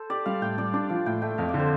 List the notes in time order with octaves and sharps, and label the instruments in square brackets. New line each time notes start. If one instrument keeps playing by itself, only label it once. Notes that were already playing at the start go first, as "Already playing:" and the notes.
Already playing: [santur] A4 C5
[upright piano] G4 [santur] D5
[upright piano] G3 [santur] F5
[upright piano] A2 [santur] G5
[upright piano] G3 [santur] D5
[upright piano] D4 [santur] D5
[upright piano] F3 [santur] F5
[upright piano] A2 [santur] G5
[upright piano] A3 [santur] G5
[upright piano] F2 [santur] F5
[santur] D5
[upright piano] D3
[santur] C5